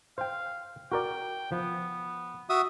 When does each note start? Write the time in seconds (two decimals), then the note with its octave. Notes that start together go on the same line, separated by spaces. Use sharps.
0.18 C5 F5 G5
0.92 F#4 A#4 D5 G5
1.52 F3 B3
2.49 F#4 E5 D#6